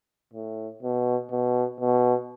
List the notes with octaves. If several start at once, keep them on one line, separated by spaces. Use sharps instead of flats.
A2
B2
B2
B2